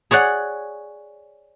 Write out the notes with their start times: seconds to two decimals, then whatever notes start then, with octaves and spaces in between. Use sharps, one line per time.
0.11 G#4 C#5 D5 F#5